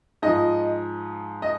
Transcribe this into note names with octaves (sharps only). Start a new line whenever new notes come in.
G#2 F3 D#5
D#5